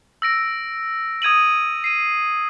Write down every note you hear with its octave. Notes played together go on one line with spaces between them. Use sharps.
E6 A#6 D7
D#6 G#6 D#7 F#7
C7 D#7